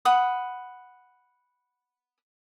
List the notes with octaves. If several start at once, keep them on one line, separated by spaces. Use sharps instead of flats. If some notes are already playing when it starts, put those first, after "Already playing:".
F#5 B5 D#6